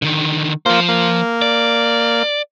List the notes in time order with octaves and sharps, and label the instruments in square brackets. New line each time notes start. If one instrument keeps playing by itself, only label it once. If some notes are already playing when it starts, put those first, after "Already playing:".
[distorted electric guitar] D3 D#3
[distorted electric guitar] F3 C5 [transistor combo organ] A#3 F4
[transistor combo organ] A#3
[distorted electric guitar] D5